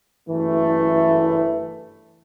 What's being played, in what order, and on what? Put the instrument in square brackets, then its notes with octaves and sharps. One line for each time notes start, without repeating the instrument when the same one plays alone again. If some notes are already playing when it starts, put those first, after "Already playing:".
[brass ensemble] F#1 G2 A3 [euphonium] E3